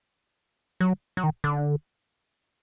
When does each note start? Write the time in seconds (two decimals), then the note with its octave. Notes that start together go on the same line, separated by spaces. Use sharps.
0.80 F#3
1.17 F#3
1.24 D#3
1.44 D3